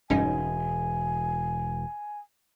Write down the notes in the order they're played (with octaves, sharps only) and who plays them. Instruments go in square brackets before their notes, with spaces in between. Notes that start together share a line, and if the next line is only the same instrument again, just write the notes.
[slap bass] E1 [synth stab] G2 C#4 D#4 [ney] G#5